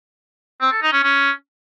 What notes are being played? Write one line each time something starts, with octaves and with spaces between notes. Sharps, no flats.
C4
A4
D#4
C#4
C#4